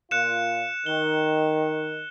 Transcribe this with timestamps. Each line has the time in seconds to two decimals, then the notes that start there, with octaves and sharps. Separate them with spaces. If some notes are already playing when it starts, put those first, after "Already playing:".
0.11 A#2 F4 F#6 C#7 E7
0.86 D#3 G7